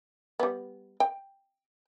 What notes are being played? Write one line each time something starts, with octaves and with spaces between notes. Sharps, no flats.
G3 B3
G5